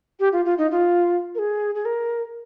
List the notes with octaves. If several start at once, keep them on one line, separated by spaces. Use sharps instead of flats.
G4
F4
F4
D#4
F4
A#4
G#4
G#4
A#4